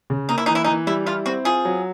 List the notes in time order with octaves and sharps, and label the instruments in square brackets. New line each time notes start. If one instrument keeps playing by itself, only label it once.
[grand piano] C#3
[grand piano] A#3 [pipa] D#4
[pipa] E4
[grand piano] E3 [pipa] D#4
[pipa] E4
D#4
[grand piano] E3
[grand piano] G3 [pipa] E4
[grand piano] E4 [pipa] F4
[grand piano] C4 [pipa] F#4
[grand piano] F4 [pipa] G#4
[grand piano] F#3